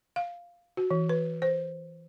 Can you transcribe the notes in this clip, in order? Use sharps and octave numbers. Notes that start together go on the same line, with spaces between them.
F5
F#4
E3
B4
C5